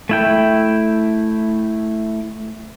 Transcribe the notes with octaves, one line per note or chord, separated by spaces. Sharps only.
A3 E4 G5